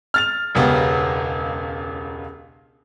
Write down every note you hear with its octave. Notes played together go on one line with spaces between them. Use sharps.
F6 A6 F7
E1 C#2 C#3 B3 G4